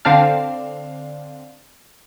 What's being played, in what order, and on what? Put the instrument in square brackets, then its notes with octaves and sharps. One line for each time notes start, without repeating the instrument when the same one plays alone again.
[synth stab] D3 C4 D4 F5